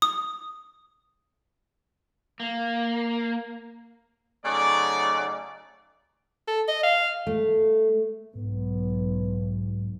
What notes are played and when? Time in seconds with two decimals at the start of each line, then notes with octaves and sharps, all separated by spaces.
0.02 D#6
2.40 A#3
4.45 C#3 F#3 A3 D#4 D5
6.48 A4
6.68 D#5
6.83 F5
7.27 A3
8.35 B1 G#2 B3